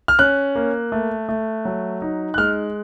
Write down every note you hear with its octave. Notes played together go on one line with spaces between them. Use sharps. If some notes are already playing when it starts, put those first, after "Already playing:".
F6
C#4 F#6
A#3
A3
A3
F#3
D#4
F#6
G#3 F6